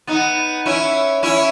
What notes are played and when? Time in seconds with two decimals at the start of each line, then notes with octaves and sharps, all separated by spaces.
0.07 B3 D#4
0.66 C#4 E4
1.23 C#4 E4